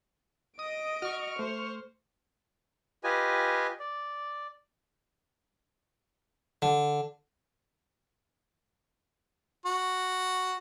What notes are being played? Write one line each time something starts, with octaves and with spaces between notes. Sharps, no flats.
D#5 D#6 D7
F#4 C#6 F6
A3 C5
F4 G4 B4 D#5 G#5
D5
D3
F#4